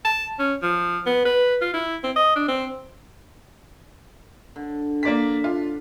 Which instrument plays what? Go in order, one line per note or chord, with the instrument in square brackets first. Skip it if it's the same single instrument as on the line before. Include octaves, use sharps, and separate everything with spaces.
[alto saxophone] A5
C#4
F3
B3
B4
F4
E4
C4
D#5
D4
C4
[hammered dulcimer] D3
[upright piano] A#3 D5 B6
[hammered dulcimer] D4 [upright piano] F4